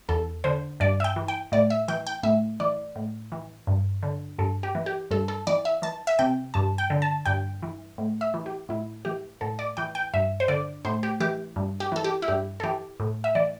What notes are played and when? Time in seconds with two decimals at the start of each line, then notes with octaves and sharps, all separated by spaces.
0.09 E2 A4
0.44 D3 C5
0.80 G2 D5
1.00 E5
1.04 G5
1.16 E3
1.28 G5
1.52 A2 D5
1.70 E5
1.88 E3 G5
2.07 G5
2.23 A2 E5
2.60 E3 D5
2.96 A2
3.32 E3
3.67 G2
4.03 D3
4.39 G2 A4
4.63 G4
4.75 E3
4.86 G4
5.11 G2 A4
5.28 A4
5.47 E3 D5
5.65 E5
5.82 E3 A5
6.07 E5
6.19 C3 G5
6.54 G2 A5
6.78 G5
6.90 D3
7.02 A5
7.26 G2 G5
7.63 E3
7.98 A2
8.21 E5
8.34 E3
8.46 G4
8.69 A2 E4
9.05 E3 G4
9.41 A2 A4
9.59 D5
9.77 E3 G5
9.95 G5
10.14 G2 E5
10.40 C5
10.48 D3 D5
10.85 A2 C5
11.03 G4
11.20 E3 G4
11.56 G2
11.80 G4
11.92 E3 A4
12.04 G4
12.22 E4
12.28 G2 G4
12.60 A4
12.63 E3 G4
13.00 A2
13.24 E5
13.35 E3 D5